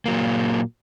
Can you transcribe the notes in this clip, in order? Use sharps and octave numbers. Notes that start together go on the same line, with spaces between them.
A#2 F#3 A#3